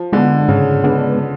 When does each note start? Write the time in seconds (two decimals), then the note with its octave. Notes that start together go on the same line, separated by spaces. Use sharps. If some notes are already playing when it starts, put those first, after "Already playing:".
Already playing: F3
0.13 D3 G#3 B3 D4
0.48 G#2 C#3
0.84 G#3 B3 D4